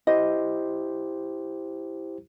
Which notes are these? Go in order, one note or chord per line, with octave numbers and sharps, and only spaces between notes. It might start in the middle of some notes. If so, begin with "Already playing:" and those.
E4 G4 C5 D#5